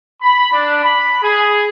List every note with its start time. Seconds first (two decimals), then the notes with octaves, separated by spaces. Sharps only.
0.21 B5
0.52 D4
0.82 B5
1.22 G#4